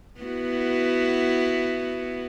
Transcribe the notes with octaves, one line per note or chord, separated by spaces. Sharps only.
B3 E4 F#4